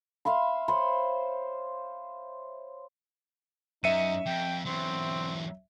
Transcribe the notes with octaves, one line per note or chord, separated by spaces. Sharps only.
E5 F5 B5 C6
C5 C#5 B5 C6
F#2 D#4 E5 C#7 D#7
F2 G5
E2 F#3 C4